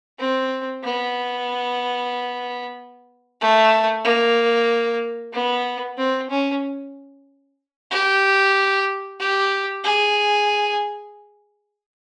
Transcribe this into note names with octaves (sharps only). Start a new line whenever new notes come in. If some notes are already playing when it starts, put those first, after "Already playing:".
C4
B3
A3
A#3
B3
C4
C#4
G4
G4
G#4